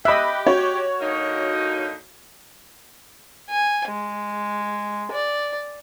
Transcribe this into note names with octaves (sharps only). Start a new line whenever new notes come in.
G4 D#5 E5 B5 F#6
F#4 C#5
D3 A#3 D#4
G#5
G#3
D5